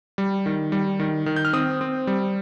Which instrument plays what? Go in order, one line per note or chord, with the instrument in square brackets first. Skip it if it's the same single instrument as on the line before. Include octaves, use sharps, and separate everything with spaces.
[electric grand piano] G3
D#3
G3
D#3
D#3
G6
F6
C4 D#6
C4
G3